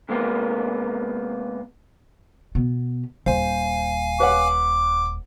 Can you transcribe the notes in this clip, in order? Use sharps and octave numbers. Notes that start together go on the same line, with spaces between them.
C3 G#3 A#3 B3
B2 B3
D#1 C5 F5 G#5
B4 C#5 F#5 D6